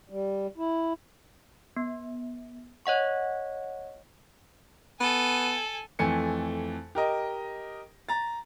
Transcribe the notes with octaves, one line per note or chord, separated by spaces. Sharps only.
G3
E4
B3
C#5 D#5 F#5 C#6
B3 A4 G#5
F2 E3 A3 G#5 C#7
G4 A#4 D#5
A#5 A6